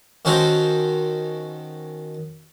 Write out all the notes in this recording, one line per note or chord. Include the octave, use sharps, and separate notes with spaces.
D#3 C#4 F#4 A4 A#4 C5